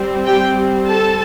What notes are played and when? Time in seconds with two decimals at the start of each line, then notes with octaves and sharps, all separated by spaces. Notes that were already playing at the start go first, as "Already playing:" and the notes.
Already playing: G3 C4
0.26 G4 G5
0.87 A4 A5